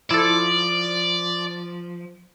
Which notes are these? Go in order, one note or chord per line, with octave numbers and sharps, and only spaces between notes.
F3 E4 A4 D5